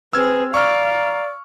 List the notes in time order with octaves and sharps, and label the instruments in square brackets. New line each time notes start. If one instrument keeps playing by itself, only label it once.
[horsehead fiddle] C4 G#4 [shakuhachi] B4 [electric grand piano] E6 F6 G#6
[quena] D5 [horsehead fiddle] F5 [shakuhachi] A#5 [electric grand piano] C#6 F6